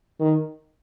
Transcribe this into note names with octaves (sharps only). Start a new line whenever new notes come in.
D#3